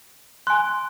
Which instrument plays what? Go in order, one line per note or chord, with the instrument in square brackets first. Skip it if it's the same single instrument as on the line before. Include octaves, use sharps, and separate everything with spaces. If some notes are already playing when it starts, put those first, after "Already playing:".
[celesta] G#5 F#6 [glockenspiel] C6